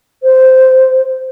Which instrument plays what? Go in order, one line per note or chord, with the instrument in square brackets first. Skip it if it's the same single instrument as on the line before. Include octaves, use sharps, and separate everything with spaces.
[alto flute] C5